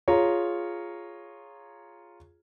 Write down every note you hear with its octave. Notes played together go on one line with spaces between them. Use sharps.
F4 G#4 C#5 A#5